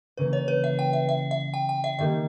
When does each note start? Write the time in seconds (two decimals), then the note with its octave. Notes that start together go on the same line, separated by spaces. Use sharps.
0.17 C#3 E3 A#3 B4
0.33 C#5
0.48 B4
0.64 E5
0.79 G5
0.93 E5
1.09 E5
1.31 E5
1.54 G5
1.69 G5
1.84 E5
1.98 D#3 G3 A#3 D#4 E5